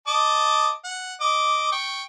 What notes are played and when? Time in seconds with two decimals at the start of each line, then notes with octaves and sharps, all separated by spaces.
0.07 D#5 A5 D6
0.84 F#5
1.21 D#5 D6
1.72 G5 C#6